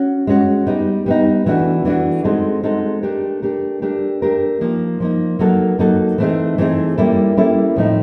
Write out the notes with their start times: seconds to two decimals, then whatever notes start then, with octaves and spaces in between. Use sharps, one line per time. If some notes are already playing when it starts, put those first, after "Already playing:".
Already playing: C#4 F#4
0.27 G#3 C#4 F#4
0.66 G3 B3 D#4
1.06 G3 B3 D#4
1.46 E3 A3 D4 F#4
1.85 E3 A3 D4 F#4
2.24 G#3 C4 D#4 F#4 A4
2.63 G#3 C4 D#4 F#4 A4
3.03 A3 D4 G4 A#4
3.42 A3 D4 G4 A#4
3.82 A3 D4 G4 A#4
4.22 A3 D4 G4 A#4
4.60 F3 A#3 D#4
5.00 F3 A#3 D#4
5.39 F#3 A#3 D#4 F#4 A4
5.79 F#3 A#3 D#4 F#4 A4
6.18 E3 A3 C4 D#4 G#4
6.58 E3 A3 C4 D#4 G#4
6.98 G3 A#3 C#4 E4 A4
7.37 G3 A#3 C#4 E4 A4
7.76 A2 F3 A3 C4 D#4